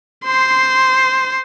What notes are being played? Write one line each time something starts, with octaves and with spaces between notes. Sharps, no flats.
C5 C6